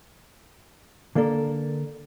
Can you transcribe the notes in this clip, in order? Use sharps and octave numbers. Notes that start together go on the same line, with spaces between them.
D3 A#3 D4 A4 A#4